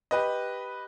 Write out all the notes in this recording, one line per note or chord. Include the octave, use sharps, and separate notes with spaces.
G4 B4 D#5